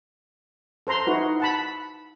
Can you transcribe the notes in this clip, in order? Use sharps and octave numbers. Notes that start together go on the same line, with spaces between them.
A4 C5 A#5 C6
D#4 E4 F#4 B4
F#5 A5 B5